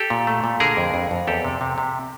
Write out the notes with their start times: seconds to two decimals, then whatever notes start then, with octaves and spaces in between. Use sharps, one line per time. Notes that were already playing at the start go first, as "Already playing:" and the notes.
Already playing: G4 A4
0.10 A#2
0.27 A3
0.44 A#2
0.60 D3 G#4 A#4
0.77 F2
0.94 F2
1.11 F2
1.27 E2 G4 A4
1.44 C3
1.61 C3
1.78 C3